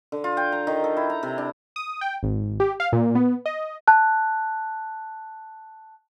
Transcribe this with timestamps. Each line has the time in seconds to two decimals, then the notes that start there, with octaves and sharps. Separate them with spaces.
0.12 D3
0.24 F4
0.37 G5
0.52 A#5
0.67 D#3
0.84 A4
0.97 E4
1.09 A#5
1.23 C3
1.38 D4
1.76 D#6
2.01 G5
2.23 G#1
2.60 G4
2.80 F5
2.92 A#2
3.15 B3
3.46 D#5
3.87 A5 F#6